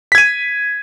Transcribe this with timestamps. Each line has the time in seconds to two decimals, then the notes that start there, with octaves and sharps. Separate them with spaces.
0.12 B6
0.15 G#6
0.18 D#7